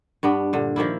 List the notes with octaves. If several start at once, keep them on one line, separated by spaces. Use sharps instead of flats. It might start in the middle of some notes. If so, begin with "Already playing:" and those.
G2 B3 D4
A#2 D3
D#3 F3 A#3 E4